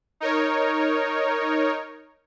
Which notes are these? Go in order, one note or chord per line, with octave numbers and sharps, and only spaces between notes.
D#4 A#4 C#5